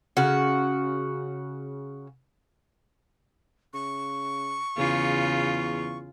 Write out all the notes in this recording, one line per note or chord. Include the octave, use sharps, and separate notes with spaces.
C#3 F#4
C#3 C#6
E2 C#3 F4